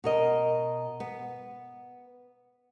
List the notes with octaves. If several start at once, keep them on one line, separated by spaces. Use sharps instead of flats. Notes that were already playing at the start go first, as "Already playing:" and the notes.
B2 A#4 D#5
B3